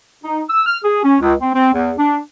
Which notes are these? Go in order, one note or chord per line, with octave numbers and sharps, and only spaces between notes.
D#4
E6
F6
G#4
C#4
C#2
C4
C4
E2
D4